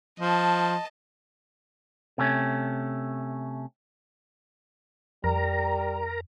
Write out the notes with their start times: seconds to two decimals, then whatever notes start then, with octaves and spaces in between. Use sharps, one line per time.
0.20 F3 D#5 A5
2.18 C3 A3 C#4
5.24 F2 G3 A#4 A#5